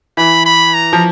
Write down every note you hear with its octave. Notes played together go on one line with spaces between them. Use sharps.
E3 B5
B5
A#5
F3